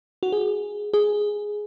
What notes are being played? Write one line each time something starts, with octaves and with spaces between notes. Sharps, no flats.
F#4
G#4
G#4